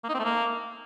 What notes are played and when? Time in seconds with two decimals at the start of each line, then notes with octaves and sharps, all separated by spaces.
0.04 A#3
0.09 D#4
0.14 C4
0.19 A3
0.24 A#3